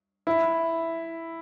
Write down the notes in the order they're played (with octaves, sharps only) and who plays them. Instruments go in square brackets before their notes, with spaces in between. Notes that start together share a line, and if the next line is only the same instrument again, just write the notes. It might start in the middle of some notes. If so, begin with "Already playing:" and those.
[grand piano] E4